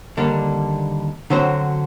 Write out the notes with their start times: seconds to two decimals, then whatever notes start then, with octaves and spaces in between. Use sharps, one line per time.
0.17 D#2 D3 G3 A#3 D4
1.30 D3 F#3 C4 F#4 C5